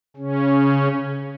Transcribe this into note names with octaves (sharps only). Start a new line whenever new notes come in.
C#3 C#4